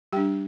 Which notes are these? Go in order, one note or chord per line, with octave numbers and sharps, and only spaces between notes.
G3 D4 G4 G5